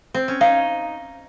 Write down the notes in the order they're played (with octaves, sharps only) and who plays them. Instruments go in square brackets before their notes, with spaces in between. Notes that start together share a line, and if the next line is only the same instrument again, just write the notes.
[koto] C4
C#4
[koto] D#4 [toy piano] F5